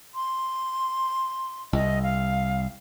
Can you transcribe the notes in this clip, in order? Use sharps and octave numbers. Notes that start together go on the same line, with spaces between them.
C6
C2 D#5
F5